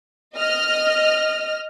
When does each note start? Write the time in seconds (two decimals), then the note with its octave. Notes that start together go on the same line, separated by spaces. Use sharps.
0.37 D#5 F6